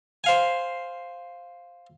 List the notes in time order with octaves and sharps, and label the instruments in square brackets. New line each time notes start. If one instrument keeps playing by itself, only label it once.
[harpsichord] C5 F5 G#5